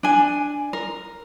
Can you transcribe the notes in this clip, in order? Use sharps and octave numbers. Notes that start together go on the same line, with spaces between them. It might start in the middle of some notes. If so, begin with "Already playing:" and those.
D4 G#5
A#4